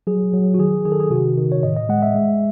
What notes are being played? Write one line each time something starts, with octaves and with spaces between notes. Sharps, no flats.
F#3 G#4
F#3
F#4
D#3 G#4
D#3 G#4
A4
G#4
C3 F#4
D#3
C#5
A2 D#5
D#5
G#3 F#5
E5
G#3